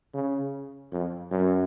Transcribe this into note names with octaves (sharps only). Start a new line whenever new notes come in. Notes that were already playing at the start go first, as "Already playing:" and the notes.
C#3
F2
F#2